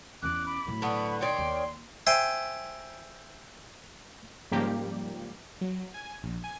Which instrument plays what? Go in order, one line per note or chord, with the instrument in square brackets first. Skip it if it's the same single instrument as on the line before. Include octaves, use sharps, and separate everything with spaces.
[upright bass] E2 C#4 [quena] D6 [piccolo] F#6
[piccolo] B5
[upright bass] A2 F#3
[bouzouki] D3 B3 [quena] C#6
[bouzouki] D#3 C#5 D5 [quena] G5 [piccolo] C6
[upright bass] D#2
[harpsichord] C5 E5 G5 G#5
[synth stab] G#2 C#3 F3 G3 A#3 G4
[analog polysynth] F#3
G#5
A#1
G#5